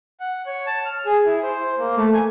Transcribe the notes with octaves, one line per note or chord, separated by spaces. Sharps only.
F#5
C#5
A5
F6
G#4
E4
C5
A#3
A3
G#5